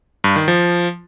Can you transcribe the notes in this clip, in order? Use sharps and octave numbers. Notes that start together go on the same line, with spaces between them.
G2
D#3
F3